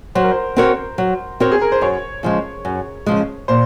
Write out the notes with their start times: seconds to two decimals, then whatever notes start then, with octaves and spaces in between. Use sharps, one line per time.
0.15 F#3 C5
0.23 A#4
0.31 C5
0.56 C4 F#4 A#4 C#5
0.98 F#3
1.40 C4 F#4 A#4 C#5
1.52 G#4
1.61 A#4
1.72 C5
1.81 F#2 C#5
2.23 C#3 F3 G#3
2.65 F#2
3.06 C#3 F3 G#3
3.48 A#2 C5